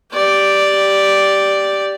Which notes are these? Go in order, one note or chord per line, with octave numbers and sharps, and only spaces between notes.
G4 D5